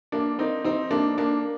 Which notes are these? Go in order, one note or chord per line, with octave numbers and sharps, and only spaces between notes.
A#3 D4
C4 D#4
C4 D#4
A#3 D4
A#3 D4